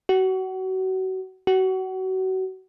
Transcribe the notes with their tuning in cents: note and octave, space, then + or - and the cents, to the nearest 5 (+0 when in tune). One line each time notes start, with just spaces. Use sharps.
F#4 +30
F#4 +30